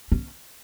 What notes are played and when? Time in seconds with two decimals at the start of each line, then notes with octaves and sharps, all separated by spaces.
0.12 C#4